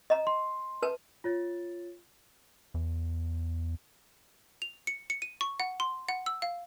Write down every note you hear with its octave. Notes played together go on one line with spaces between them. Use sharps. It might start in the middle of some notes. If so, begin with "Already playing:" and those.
D#5 A#5
C6
B4 A5
F4 C#5 A6
E2
F7
C#7
C#7
D#7
C#6
F#5
C6
F#5
E6
F5